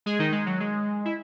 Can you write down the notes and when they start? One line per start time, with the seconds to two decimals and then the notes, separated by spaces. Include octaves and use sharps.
0.06 G#3 G#4
0.19 D#3 D#4
0.32 G#3
0.46 F#3
0.60 G#3
1.05 E4